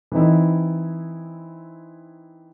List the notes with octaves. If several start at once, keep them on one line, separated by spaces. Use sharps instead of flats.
E3 C4 D#4 E4